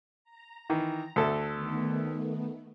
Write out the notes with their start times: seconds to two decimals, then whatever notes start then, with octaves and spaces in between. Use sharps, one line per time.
0.24 A#5
0.70 D#3 E3
1.16 D2 A4 E5
1.55 D#3 A3 B3